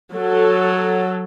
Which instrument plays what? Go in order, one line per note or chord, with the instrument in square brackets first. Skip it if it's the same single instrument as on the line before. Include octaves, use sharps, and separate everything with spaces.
[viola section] F#3 A4